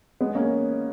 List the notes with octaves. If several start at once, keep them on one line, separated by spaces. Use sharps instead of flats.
G#3 B3
A#3 C#4